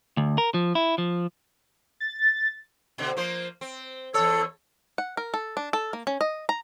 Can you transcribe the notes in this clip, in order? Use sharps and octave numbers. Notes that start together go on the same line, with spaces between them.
D2
A#4
F3
E4
F3
A6
B2 D3
F3 A#3 C5
C4
E2 A4 C#5
F#5
A#4
A4
D4
A4
A#3
C#4
D#5
A#5